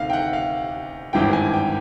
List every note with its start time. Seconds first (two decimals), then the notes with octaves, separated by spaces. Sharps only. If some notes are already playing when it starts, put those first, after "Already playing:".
Already playing: D2 C3 D#3 F5
0.10 G5
0.13 F#5
0.33 F5
1.13 G#1 G2 E3 G5
1.33 G#5
1.54 G5